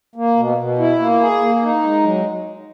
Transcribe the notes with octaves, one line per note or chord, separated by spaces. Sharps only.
A#3
B2
B2
E4
A#3
G#4
A#3
D#4
G#3
F#3